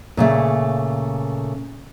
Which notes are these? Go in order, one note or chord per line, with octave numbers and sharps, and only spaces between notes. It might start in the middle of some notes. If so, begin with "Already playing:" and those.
A#2 C#3 A3